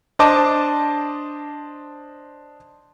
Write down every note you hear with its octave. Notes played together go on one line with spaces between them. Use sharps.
D4 C5 D#5 A5 D6